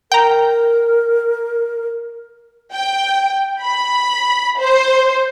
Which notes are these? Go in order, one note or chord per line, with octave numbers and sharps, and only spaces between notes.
A#4 G5 A#5
G5
B5
C5